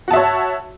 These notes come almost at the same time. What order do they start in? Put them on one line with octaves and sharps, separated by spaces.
F#4 A5 E5 C#5